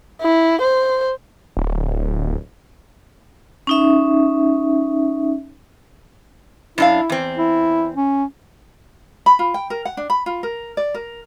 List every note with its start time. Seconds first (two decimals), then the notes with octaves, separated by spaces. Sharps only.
0.22 E4
0.61 C5
1.57 D1
3.67 C#4 D#4 E5
6.78 F#2 D4 E4 F5
7.10 E2 C4
7.37 E4
7.95 C#4
9.26 B5
9.39 F4
9.54 G5
9.70 A#4
9.85 F#5
9.97 D4
10.10 B5
10.26 F4
10.43 A#4
10.77 D5
10.94 A#4